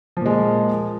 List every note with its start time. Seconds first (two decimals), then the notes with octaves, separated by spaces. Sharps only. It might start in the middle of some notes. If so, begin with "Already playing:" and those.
0.17 F3
0.21 A#2
0.26 G#3